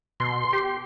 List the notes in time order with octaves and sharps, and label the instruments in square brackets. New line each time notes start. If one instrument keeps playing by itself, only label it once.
[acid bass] B2 [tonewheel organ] C6
[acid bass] G4